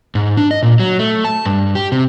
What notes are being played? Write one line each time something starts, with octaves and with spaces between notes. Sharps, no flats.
G#2
D4
D#5
A#2
F#3
A3
A5
G2
G4
C3